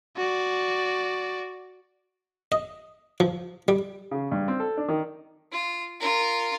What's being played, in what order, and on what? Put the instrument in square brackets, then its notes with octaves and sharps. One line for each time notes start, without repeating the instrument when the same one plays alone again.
[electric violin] F#4 D5
[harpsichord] D#5
F3
G3
[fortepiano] C#3
G2
C4
A4
D4
D#3
[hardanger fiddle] F4
F4 A#4